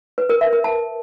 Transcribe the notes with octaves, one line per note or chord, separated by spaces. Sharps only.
B4
A#4
E5
A#4
A5